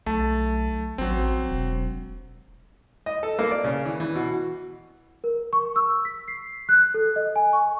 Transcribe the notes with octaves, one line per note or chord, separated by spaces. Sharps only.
B1 A3 A5
A1 F#3 C4
E1
D#5
A4
A#3
D5
C#3
E3
E3
B2
A#4
C#6
E6
B6
C7
F#6
A4
D#5
G#5
C#6